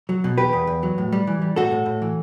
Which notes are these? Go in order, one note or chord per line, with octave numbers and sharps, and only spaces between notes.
F#3
B2
E2 G4 B4
E2
E2
F#3
A2
G3
E3
G3
A2 F#4 A4
A2
A2
E3